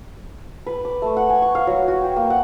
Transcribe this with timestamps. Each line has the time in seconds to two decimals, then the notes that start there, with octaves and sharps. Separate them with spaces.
0.66 B4
0.85 D6
1.02 A3
1.17 F#5
1.30 G#5
1.42 C#6
1.55 F5
1.67 F#3
1.88 F#4
2.01 G5
2.16 A#3
2.30 F#5